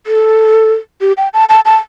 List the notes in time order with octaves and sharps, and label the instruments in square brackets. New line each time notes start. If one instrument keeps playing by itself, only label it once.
[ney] A4
G4
G5
A5
A5
A5